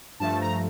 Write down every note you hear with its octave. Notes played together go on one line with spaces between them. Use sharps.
G2 F3 A3 A5
A#5